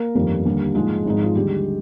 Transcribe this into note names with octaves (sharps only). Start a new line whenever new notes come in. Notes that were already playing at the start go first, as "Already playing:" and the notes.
Already playing: A#3 A#4
G1 F2 D#3 G3
D#2 D3 G3
A#1 G#2 F3 G#3 G#4
G#1 G#2 F3 G#3 D#4
F4
D#2 D3 G3 G#3 G4